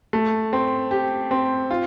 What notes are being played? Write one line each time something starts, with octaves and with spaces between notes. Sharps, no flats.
A3
C4
G4
C4
F4